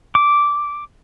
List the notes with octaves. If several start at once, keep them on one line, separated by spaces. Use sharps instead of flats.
D6